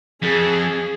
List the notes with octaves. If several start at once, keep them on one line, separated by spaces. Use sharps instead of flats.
F2 G#4